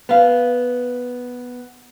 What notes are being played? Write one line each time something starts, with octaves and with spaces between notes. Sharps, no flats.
B3 F5